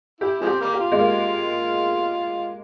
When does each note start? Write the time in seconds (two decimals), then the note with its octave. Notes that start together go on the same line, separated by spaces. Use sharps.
0.20 E4 G4
0.41 F3 G#3 C4
0.47 G4
0.61 G3 A#3
0.73 G4
0.79 F4
0.92 G#3
0.99 A#3